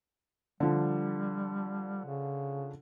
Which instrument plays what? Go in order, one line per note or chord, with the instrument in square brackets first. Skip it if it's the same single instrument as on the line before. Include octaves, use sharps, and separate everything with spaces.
[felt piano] D3 F3 [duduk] G3
[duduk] C#3